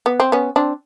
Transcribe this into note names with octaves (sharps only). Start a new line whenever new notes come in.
B3
C4
B3 C#4
C4 D4